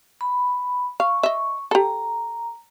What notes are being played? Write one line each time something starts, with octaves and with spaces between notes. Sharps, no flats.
B5
F5 C#6
D#5 E5
G4 A4 A#5